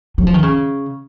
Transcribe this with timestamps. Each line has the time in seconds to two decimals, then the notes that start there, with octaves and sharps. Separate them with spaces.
0.18 F#3
0.27 F3
0.34 D#3
0.43 C#3